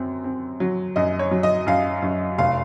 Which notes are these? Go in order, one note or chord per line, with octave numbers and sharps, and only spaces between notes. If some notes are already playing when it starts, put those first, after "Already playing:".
Already playing: F#2 C4
C4
F#3
F#2 D#5
C#5
F#3
D#5
F#2 F5
F#2
F1 F5